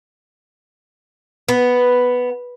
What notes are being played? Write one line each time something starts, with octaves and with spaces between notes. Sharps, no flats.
B3